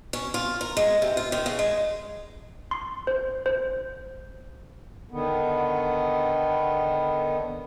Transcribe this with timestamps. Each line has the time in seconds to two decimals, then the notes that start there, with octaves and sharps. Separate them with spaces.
0.13 C#4
0.34 F4
0.61 A#4
0.77 G#3
1.02 C3
1.17 F4
1.32 D#3
1.46 C#3
1.59 G#3
2.71 C6
3.07 C5
3.46 C5
5.11 D3 D#3 B3